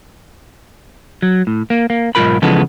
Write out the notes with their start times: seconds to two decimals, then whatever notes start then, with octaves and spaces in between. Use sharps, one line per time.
1.22 F#3
1.47 A2
1.70 A#3
1.90 A#3
2.15 B1 G#2 C#3 F4 A#4 B5
2.42 C#3 E3 F3 G#3 B3 A4